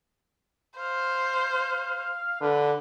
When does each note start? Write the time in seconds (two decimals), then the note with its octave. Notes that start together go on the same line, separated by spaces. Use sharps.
0.79 C5 F5
2.41 D3 B4